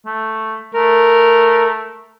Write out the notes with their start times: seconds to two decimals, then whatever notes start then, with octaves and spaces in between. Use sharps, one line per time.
0.06 A3
0.74 A3 A#4